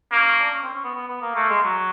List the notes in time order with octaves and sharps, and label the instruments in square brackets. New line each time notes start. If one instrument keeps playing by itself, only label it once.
[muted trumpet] A#3 [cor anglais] C#4
[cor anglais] C#4
D4
C#4
C4
C#4
B3
B3
B3
A#3
[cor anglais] A3 [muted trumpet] A#3
[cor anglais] G#3
F#3